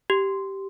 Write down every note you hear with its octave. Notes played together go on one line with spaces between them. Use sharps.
G4